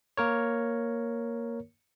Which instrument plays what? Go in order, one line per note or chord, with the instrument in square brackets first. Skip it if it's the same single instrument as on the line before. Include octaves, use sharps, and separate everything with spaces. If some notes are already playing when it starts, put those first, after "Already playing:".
[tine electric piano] A#3 A#4 C#5